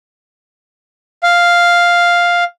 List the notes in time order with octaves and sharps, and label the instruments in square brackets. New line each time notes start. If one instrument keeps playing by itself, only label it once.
[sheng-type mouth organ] F5